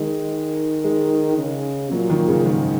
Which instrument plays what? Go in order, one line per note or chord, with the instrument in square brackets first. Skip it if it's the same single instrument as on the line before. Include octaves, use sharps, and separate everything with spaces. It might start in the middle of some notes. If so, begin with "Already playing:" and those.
Already playing: [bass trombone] D#3 [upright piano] G#3
[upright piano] G#3
[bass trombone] C#3
[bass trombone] A#2 [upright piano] F#3
[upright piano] D#3
C#3
[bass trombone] G#2 [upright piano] D#3